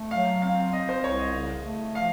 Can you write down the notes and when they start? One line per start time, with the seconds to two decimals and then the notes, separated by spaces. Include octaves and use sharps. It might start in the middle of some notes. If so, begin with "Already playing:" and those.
Already playing: A3
0.11 F#3 F5
0.42 C4 F5
0.72 C4 D#5
0.89 C5
1.04 C2 C#5
1.19 D#5
1.34 C#3
1.64 A3
1.95 F3 F5